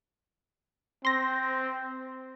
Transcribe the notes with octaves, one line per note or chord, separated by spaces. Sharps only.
C4 C6 A#6